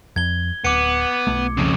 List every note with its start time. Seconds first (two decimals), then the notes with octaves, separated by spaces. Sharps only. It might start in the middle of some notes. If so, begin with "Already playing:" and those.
0.16 F2 G#6 G7
0.65 D1 B3 D6 C#7
1.27 B1 A3
1.57 F2 C#3